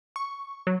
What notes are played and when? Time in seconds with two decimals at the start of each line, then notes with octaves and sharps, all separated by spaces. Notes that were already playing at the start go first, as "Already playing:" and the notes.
0.16 C#6
0.67 F#3